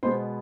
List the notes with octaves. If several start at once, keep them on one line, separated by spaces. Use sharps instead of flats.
B2 G#3 B3 C5 C6